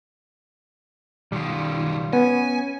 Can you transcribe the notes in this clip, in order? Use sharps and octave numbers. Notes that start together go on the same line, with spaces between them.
B1 D#3 G3 F4
B3 C#4 G#5